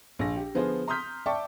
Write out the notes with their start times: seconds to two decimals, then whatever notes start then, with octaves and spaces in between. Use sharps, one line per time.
0.19 A#1 A#6
0.36 G4
0.54 D3 F3 B3 F4 G#4 C5
0.88 A#5 C6 D#6 F6 G6 B6
1.26 D5 E5 G5 A5 C#6 D6